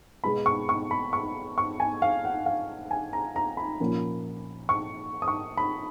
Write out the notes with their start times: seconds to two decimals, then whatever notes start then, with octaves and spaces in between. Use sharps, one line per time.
0.24 B2 G#3 B3 B5
0.46 C#6
0.69 C#6
0.91 B5
1.13 C#6
1.58 C#6
1.80 G#5
2.02 F5
2.25 F#5
2.46 F5
2.91 G#5
3.13 A#5
3.36 A#5
3.57 B5
3.80 A#2 F3 A#3 C#4
4.69 C#6
5.22 D#6
5.28 C#6
5.57 B5